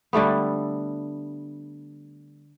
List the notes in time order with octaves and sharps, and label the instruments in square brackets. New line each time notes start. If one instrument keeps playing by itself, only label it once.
[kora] D3 G3 A3 B3